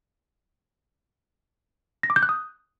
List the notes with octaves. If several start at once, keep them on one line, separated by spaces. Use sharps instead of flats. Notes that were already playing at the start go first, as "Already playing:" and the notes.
A#6
D6
G6
F#6
D#6